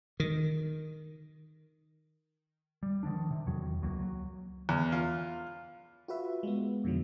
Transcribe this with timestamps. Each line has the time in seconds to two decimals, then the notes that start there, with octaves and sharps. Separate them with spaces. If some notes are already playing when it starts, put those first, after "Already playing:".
0.20 D#3
2.83 G3
3.03 D#3 F3 F#3 D4
3.31 C3
3.46 E2 D#3 F#3
3.82 C#2 F#3 A3 A#3
4.02 F#3
4.69 E2
4.92 F4
6.08 F4 F#4 B4 E5
6.43 G#3 B3
6.84 F2 B2 D3 D#3 F#3